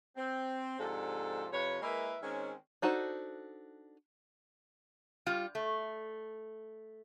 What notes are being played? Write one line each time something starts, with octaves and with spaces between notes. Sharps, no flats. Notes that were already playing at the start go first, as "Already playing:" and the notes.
C4
G#2 C3 F3 D4 A4
F2 C3 B4 C#5
G#3 A#3 E4 A#4 B4 E5
D#3 G#3 C4 C#4
D4 D#4 F#4 A4 C5
G3 F4
A3